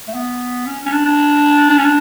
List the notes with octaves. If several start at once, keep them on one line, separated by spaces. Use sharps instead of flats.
A3
B3
C#4
C#4
D4
D4
D4
C#4
D4